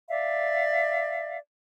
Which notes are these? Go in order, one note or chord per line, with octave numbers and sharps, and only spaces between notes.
D5 E5 F5